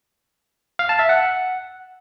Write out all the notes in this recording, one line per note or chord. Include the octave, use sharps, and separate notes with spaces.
F5
A5
E5
F#5